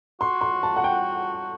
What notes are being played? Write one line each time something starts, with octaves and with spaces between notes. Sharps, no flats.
F#4 C6
C6
A5
F#5
G5